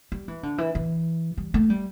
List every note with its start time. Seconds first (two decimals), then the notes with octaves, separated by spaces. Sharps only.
0.12 G3
0.28 E3
0.43 D3
0.58 E3
0.75 E3
1.37 G3
1.54 A3
1.70 G3